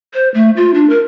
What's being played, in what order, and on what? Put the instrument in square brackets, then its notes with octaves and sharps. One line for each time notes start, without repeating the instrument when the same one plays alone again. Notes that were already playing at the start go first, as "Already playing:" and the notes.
[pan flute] C5
A3
F4
D4
A#4